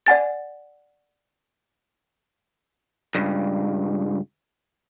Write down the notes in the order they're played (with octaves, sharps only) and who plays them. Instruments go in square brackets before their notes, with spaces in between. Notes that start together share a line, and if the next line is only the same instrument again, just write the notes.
[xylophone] D5 F#5 G#5 A6
[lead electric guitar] C#2 G2